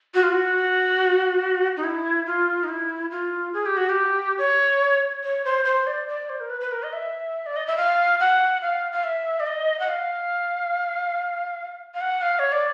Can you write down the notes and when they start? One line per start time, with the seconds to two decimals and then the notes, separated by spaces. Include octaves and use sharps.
0.14 F#4
0.23 F4
0.32 F#4
1.77 D#4
1.84 E4
2.26 F4
2.64 D#4
2.68 E4
3.11 F4
3.53 G#4
3.66 G4
3.77 F#4
3.89 G4
4.38 C#5
5.23 C#5
5.45 C5
5.65 C5
5.87 D5
6.08 D5
6.29 C5
6.40 A#4
6.50 B4
6.61 B4
6.72 A#4
6.83 D#5
6.93 E5
7.46 D5
7.56 D#5
7.67 E5
7.77 F5
8.20 F#5
8.62 F5
8.92 F5
9.04 E5
9.40 D5
9.46 D#5
9.80 F#5
9.89 F5
11.94 F5
12.01 F#5
12.22 F5
12.39 C#5
12.52 D5